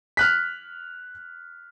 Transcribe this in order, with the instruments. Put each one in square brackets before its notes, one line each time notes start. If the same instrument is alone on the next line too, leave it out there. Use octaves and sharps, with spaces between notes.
[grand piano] F6 F#6 B6